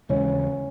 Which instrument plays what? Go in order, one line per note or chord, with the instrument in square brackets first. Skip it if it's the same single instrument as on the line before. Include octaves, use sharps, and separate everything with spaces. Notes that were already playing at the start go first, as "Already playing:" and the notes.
[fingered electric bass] D#2 C#3 E3 G#3 [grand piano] C#4